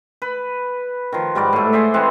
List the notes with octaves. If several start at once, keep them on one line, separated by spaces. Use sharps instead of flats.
B4
D#3 F3
G#2 G3 F#4 D5
A2 A3
G#4 C5 D5 E5
E3 G#3 C4 F#5